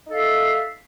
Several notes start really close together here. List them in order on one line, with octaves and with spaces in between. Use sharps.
D#4 A4 F5 E5